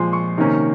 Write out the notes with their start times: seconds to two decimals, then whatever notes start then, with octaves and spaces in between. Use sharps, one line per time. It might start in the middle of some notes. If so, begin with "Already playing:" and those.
Already playing: A#2 F3 G#3 C6
0.13 C#6
0.38 C3 D#3 A#3 C#4